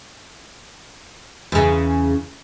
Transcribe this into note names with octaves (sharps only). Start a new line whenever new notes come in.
E2 C#3